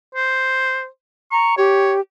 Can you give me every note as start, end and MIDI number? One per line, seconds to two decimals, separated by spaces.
0.15 0.87 72
1.32 1.54 82
1.32 1.57 85
1.57 2.00 67
1.57 1.94 73